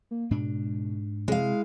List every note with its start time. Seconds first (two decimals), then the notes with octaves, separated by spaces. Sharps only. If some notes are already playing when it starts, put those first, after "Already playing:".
0.11 A#3
0.31 G#2 B2 D4
1.28 C3 G#3 E4 F5